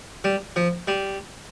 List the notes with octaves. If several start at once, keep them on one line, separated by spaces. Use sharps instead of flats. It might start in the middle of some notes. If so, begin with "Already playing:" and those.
G3
F3
G3